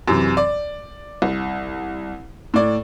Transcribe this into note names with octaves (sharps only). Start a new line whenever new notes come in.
F#2 C3 E3
D5
C2
A2 D5